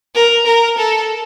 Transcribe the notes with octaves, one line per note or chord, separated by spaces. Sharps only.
A#4
A#4
A4